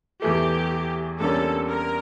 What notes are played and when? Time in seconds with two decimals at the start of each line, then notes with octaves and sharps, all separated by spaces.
0.22 E2 E3 A3 G4
1.20 E2 D3 G3 A#3 C#4 A4
1.69 A#4